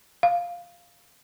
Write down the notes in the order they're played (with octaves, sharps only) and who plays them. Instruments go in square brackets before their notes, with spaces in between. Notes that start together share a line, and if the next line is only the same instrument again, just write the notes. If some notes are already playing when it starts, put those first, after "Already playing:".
[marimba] F5